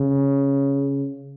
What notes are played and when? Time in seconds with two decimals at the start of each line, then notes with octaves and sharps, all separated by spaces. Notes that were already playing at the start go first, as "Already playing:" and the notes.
Already playing: C#3